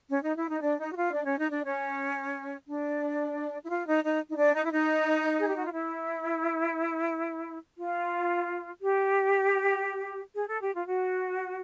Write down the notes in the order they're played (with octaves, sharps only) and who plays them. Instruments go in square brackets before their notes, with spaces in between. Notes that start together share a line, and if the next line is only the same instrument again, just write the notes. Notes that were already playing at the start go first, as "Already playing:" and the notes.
[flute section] C#4
D#4
E4
D#4
D4
D#4
F#4
F4
D4
C#4
D#4
D4
C#4
D4
E4
F4
D#4
D#4
D#4
D4
D#4
E4
D#4
G#4
G4
F#4
F4
E4
F4
G4
G#4
A4
G4
F4
F#4